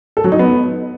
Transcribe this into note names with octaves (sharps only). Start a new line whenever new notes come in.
A4
F#3
D#4
B3